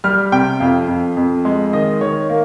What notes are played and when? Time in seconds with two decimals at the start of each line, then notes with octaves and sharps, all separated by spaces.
0.04 G3 F6
0.32 C3 G5
0.60 F2 F5
0.88 F2
1.17 F2
1.45 G#3
1.73 D#3 D#5
2.01 D#3 C#5
2.30 A#3